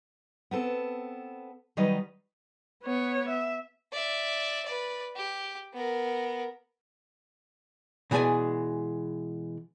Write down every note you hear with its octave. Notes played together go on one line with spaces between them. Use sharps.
B3 C4 A4
D#3 F#3 G3 D#4 B4 D#5
B3 C#5
E5
D5 E5
B4 D5
G4
B3 A#4
B2 E3 G#3 G#4 D5 G#5